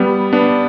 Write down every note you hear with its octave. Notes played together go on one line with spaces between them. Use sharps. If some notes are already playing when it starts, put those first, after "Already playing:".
Already playing: G3 B3
B3 D4